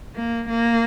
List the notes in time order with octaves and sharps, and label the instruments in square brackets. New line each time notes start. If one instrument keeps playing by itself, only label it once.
[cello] A#3
A#3